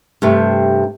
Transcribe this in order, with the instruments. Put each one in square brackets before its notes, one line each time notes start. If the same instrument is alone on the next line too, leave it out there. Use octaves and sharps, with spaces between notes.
[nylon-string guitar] G2 C3 A3